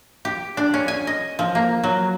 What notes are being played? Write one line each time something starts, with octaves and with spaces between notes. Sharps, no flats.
G4
D4
C#4
G#5
D#5
F3
A#3
F#3